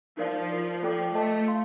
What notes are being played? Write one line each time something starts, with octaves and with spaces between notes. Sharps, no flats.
F3 D#4 A#4 D5 F5
F4 A#4 D5
F3 F4 A4 D5 G5 D6
A3 A4 D#5 A5
F5 C6